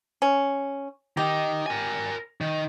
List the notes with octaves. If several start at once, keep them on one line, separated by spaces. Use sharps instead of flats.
C#4
D#3 D#4 G4
A#4 G#5
D#3